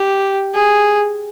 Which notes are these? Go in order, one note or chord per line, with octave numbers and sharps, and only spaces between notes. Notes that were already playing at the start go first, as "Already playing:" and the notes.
Already playing: G4
G#4